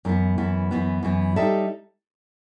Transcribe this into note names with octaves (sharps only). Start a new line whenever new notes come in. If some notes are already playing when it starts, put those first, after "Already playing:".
F#2 E3 B3
F#2 E3 B3
F#2 E3 B3
F#2 E3 B3
G3 D#4 A4 E5